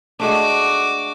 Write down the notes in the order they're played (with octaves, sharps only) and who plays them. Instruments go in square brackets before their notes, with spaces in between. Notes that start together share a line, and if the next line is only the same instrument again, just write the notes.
[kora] G#3 A3 D4 [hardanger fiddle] F#4 D6